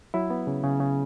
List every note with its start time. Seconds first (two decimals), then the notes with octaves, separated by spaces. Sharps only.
0.14 F#3 E4
0.30 B3
0.47 C#3
0.64 C#3
0.80 C#3